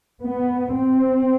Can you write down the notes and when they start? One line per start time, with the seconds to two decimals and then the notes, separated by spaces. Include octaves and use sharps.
0.21 B3
0.73 C4